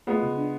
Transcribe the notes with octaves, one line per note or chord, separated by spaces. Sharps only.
G#3 B3 F4
C#3
D4